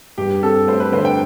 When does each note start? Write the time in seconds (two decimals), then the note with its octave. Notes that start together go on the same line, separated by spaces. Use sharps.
0.18 G2 G4
0.42 C4 A4
0.67 A3 C5
0.80 B4
0.92 D3 C5
1.05 G5